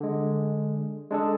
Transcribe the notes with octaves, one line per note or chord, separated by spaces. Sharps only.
D3 G#3
G#3 D4 G#4 A4